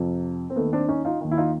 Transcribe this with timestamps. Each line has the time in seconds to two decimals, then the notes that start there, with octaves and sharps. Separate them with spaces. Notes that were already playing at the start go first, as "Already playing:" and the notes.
Already playing: F2 C3 F3
0.50 C4
0.56 D#2 D#3 A3 B3
0.72 C4 D4
0.88 C#4 D#4
1.05 D#4 F4
1.21 D#2 D#3
1.31 E4
1.37 D#4 F4